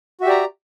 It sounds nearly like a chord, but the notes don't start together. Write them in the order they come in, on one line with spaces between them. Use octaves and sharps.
F#4 E5 G4 D5 A#5